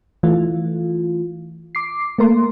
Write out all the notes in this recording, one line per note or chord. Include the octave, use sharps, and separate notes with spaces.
E3 A3 F4
D6 C7
A3 A#3 A#4 C6